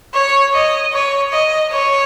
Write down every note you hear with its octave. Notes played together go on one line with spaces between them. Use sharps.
C#5
D#5
C#5
D#5
C#5